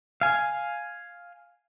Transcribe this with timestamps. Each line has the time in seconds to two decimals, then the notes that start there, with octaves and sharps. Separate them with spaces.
0.21 F5 G#5